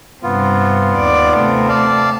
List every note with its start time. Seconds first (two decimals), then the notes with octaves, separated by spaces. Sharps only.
0.23 G2 C3 B3 F4
0.98 D#2 D5
1.38 C3 A3
1.69 D5 F5 A5